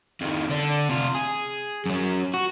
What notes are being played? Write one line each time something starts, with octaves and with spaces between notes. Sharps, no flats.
F2 D#3
D3 D4
C3 F4
G#4
F#2 F#3
F#4